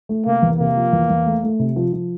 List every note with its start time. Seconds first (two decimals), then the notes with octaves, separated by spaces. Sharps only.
0.09 A3
0.26 C3 A#3
0.42 E2
0.59 C3 A#3
0.76 F3
0.93 E2
1.10 E2
1.26 A3
1.43 A3
1.59 C3
1.76 F3
1.93 F3